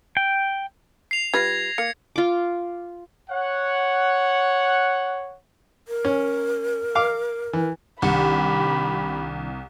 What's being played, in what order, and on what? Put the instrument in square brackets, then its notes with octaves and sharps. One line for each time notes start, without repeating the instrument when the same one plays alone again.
[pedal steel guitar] G5
[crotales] C7 F7
[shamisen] G3 F4 B4 [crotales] G#6 A#6 C7
[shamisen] A#3 [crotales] C#7
[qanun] F4 D6
[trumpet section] C#5 F#5
[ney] A#4
[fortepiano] C#4
F5 D6
E3
[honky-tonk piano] C2 [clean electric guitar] D#3 D4 F#5 [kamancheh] G4 B5